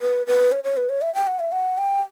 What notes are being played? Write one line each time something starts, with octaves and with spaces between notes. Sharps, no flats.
B4
B4
C#5
C#5
B4
C#5
E5
G5
F#5
E5
F#5
G5